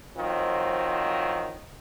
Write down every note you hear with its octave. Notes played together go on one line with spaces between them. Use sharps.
D#3 F3 F#3 C4